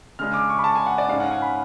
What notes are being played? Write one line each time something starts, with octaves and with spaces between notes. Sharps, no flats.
C#3 G#3 D4 F6
D6
C#6
B5
A5
G#5
F#5
D5
G#2 G#3 C#4 F5
F#5
G#5
B5